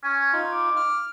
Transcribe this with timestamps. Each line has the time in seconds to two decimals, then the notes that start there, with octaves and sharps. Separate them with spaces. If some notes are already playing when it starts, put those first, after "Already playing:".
0.04 C#4 G#5
0.33 D#4 F4
0.52 D6
0.76 F6